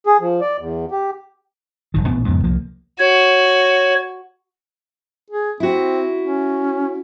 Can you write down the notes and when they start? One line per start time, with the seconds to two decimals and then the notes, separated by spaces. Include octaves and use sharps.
0.07 G#4
0.20 F3
0.41 D5
0.59 E2
0.91 G4
1.94 F#1 C2 D#3
2.06 A1 A#2 B3 D4
2.26 F2 G#2 C#3 B3
2.44 C2 F3 A#3
3.00 F#4 C#5
5.30 G#4
5.60 C4 E4 F#4
6.21 C#4